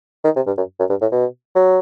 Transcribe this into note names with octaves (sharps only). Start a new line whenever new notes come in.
D#3
C3
G2
F#2
F#2
G2
A2
B2
F#3